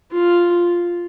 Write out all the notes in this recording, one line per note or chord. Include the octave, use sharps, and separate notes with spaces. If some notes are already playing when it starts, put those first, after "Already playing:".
F4